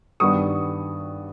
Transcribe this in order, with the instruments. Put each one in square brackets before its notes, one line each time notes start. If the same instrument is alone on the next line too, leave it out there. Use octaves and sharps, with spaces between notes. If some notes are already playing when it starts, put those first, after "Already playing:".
[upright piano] G2 D#3 G3 B3 C#6 D#6